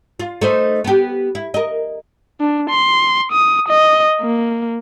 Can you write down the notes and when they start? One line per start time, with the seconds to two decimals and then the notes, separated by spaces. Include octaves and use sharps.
0.20 F4
0.41 A3 D#4 C5
0.84 B3 G4
1.35 E4
1.54 A#4 D#5
2.41 D4
2.70 C6
3.32 D#6
3.69 D#5
4.21 A#3